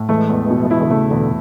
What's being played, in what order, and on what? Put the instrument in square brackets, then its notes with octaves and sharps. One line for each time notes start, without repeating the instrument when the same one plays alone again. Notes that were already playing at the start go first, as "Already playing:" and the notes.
Already playing: [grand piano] A2
[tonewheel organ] E3 G#3 [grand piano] A3
[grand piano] E2
B2
[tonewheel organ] E3 G#3 [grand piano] E4
[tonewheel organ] D3
[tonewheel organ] C#3 [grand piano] A3
[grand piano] E2 [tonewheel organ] B2 D3